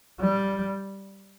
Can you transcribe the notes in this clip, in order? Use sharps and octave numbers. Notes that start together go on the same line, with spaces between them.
G3